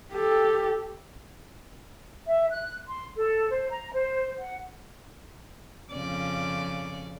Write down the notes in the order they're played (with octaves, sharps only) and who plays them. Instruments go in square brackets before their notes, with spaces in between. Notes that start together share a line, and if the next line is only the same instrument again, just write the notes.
[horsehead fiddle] G4 A4
[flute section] E5
F#6
C6
A4
C5
A#5
C5
F#5
[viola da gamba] F2 C#3 D5